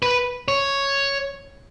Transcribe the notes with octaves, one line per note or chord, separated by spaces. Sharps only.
B4
C#5